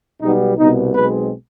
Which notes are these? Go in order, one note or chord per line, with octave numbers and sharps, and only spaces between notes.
B1 B2 G3 B3 D#4
C2 B2 B3 D#4
B1 B2 G#3 C4 B4